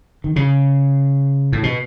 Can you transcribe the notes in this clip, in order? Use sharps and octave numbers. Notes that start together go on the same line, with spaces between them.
D#3
C#3
A2
B2